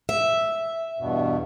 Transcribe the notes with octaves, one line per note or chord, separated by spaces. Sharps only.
E5
E2 G2 B2